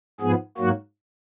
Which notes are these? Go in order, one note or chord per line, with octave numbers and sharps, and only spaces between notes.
G#2 F3 B3 G#4
G#2 F#3 A#3 F#4